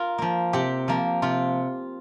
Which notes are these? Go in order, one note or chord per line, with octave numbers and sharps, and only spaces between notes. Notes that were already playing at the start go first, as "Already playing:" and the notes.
Already playing: F4 A#4
F3 A#3
C3 G4
F3 A#3
C3 F4